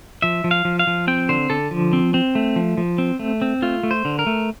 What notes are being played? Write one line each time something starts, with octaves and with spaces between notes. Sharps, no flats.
F3 E5
F3
F5
F3
F5
F3
C4 G5
D3 C5
D3 A4
F3
C4
C4
A3
F3
F3
C4
A3
C4
A3 F4
A3
C5
D3
A#4
A3